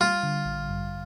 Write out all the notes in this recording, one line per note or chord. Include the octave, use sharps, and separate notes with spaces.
G3 F4
D3
A1
G2